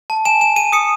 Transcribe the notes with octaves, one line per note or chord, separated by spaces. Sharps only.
A5
G#5 E7
G#5 E7
G#5 D#7
D#6 C#7